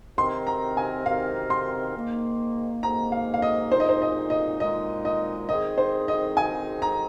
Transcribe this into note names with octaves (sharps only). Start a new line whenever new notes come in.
C3 D#3 C4 D#4 A#4 C6
A#5
G#5
C3 D#3 C4 D#4 A#4 F5
C6
G#2 D#3 A#3
G#2 D#3 A#3 A#5
F5
F5
D#5
A#2 G#3 D#4 C5
D#5
C5
D#5
D#5
A#2 G#3 D#4 D#5
D#5
D#3 C4 D#4 G#4 D#5
C5
D#5
D#3 C4 D#4 G#4 G#5
A#5